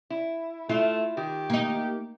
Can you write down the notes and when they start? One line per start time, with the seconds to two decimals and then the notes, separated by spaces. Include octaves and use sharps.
0.10 E4
0.69 A3 E4 F4
1.17 D#3 G4
1.50 A#3 D#4